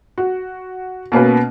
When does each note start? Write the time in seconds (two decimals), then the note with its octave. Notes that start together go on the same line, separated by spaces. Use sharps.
0.18 F#4
1.12 B2 A#3 C#4 B4